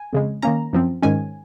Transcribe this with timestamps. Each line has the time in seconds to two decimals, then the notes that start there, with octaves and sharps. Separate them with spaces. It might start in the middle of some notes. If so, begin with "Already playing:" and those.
Already playing: G#5
0.13 F2 C#3 G#3
0.42 D#3 A#3 C#4 A#5
0.73 F#2 F3 C4
1.02 G#2 D#3 G#3 C#4 G#5